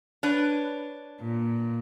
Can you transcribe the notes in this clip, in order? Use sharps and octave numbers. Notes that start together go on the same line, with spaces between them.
D4 B4 C#5
A#2